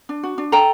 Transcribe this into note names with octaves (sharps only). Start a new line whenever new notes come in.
D4
F#4
D4
A4 G5 A#5